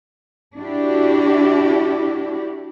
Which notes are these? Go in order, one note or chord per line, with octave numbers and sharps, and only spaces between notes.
D4 E4 F#4 G4